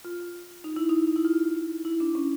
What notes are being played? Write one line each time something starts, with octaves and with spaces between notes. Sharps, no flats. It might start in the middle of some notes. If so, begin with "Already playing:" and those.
F4
D#4
E4
D#4
E4
F4
E4
D4
C#4